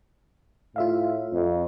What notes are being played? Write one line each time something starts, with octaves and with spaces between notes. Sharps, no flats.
A2 F4 E5 F5
F2